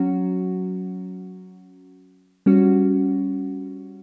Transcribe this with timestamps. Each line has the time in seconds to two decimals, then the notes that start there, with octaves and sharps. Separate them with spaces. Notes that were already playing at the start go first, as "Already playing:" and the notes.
Already playing: F#3 C#4 F#4
2.46 G3 C#4 F#4